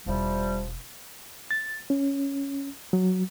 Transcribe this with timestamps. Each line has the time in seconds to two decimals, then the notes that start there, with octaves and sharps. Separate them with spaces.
0.06 E1 C3 F3 G3 E4
1.51 A6
1.90 C#4
2.93 F#3